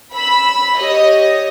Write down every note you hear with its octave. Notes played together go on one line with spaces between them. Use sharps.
B5 E6
G4 C#5 D#5